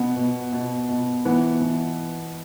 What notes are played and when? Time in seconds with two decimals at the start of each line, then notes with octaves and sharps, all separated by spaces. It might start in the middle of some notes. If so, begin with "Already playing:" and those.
Already playing: B2 B3
0.16 B2
0.53 B2
0.89 B2
1.25 E3 B3
1.61 E3